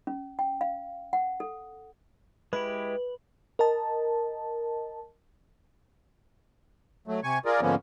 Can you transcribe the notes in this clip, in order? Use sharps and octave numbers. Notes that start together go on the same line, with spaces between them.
C#4
G5
F5
F#5
A4
G#3 E4 G4 B4
A#4 D#5 A5
F#3 A3
C3 G#5 C#6
F4 G#4 A#4 D5
G#2 D3 F3 A#3 B3 C#4